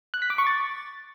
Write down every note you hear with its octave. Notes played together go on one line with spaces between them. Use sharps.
F#6
B6
D6
C#6
A6